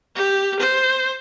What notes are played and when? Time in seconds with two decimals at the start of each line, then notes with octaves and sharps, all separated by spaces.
0.15 G4
0.60 C5